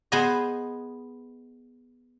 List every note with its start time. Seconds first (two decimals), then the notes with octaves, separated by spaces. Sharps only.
0.12 B3 G#4 C5 D#5